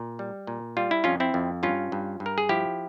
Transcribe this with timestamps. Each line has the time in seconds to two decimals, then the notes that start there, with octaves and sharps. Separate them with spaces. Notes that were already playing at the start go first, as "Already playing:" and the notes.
Already playing: A#2
0.19 G3
0.47 A#2
0.77 G3 F4
0.91 E4
1.04 F2 C#4 F4
1.20 C4 E4
1.34 F2
1.63 G2 C#4 F4
1.92 G2
2.20 G2
2.26 A#4
2.38 G#4
2.49 F3 E4 G4